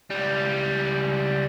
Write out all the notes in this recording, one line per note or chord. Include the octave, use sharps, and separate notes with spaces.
C#2 G3